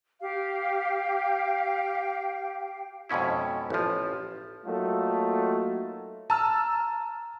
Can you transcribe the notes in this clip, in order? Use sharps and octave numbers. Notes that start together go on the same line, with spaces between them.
G4 F5 G5
F2 G#2 B2 C#4 E4
A1 F3
F#3 A3 A#3 D#4 F4 A4
A5 A#5 E6 F6